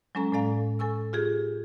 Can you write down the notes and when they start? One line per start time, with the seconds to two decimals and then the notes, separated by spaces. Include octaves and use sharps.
0.15 F#3 G#3 C#4 A4 A#5
0.32 A2 G#3 A4 D5 F5 A#5
0.79 A4 G#5 C#6 E6
1.13 F4 G4 G#4